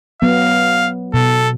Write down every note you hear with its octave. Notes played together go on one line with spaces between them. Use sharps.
F#3 B3 F5
B2 A4